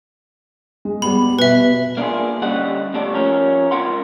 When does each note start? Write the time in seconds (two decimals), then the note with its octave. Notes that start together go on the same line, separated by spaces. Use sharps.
0.85 G#3
1.02 G3 B3 B5
1.39 B2 B4 E5
1.97 A#3 D4 D#4 F4 G#4
2.42 G2 D3 G3 C#4 D#5 F#5
2.94 C3 A3 D5 A5
3.13 F3 C#4 A#4
3.71 C#2 C4 F4 A#4 F#5 C6